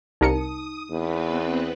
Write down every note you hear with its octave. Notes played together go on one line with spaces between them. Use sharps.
C2 D#4 A#4 D#6 C#7
E2 B3 C4 B4